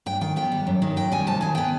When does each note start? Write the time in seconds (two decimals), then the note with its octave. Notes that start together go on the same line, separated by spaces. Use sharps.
0.06 G2 G5
0.21 D#3 G5
0.36 B3 G5
0.52 G3
0.67 F#2
0.82 D#3
0.96 F#2 G5
1.12 G3 G#5
1.27 C3 A5
1.41 D#3 G#5
1.55 B3 G5